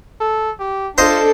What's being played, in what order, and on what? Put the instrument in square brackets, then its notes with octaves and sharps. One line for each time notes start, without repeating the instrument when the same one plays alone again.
[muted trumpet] A4
G4
[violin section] D4 A4 [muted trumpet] F4 [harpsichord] C5 D#5 C6